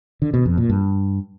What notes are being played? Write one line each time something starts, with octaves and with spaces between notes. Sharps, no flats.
D3
B2
F2
A#2
G2